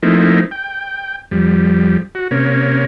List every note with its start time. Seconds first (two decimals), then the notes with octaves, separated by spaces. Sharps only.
0.03 F3 A3 A#3 C4 D#4 E4
0.51 G5
1.31 F2 G3
2.15 F#4
2.31 C3 A#3 C#4